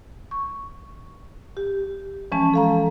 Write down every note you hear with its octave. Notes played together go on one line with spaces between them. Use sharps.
C#6
G4
E3 F3 G#3 C#4 A5
A4 F5 A#5